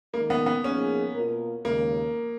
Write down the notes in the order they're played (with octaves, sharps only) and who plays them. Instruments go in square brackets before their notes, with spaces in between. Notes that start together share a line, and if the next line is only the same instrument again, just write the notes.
[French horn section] D#3 G#3 D#4 A#4 [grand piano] A#3
[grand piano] B3
B3
[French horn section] F3 A#3 D#4 G#4 [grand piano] C#4
[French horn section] B2 A#3 F4 A#4
[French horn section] D#2 C#3 G#3 [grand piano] A#3